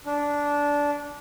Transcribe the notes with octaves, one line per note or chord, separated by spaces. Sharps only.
D4